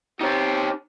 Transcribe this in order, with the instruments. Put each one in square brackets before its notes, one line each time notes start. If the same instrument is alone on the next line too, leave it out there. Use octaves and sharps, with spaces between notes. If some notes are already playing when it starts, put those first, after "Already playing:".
[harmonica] C4 G4 [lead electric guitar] D#4 C#5